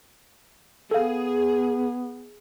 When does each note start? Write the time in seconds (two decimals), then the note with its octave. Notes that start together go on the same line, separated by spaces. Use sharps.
0.91 B3 G#4 A4 F5